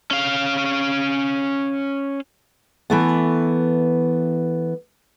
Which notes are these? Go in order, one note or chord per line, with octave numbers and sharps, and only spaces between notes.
C#4 F5
E3 A3 B3